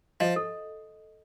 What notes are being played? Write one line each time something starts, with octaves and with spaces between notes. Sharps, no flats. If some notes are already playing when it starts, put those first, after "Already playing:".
F3 D#5
A4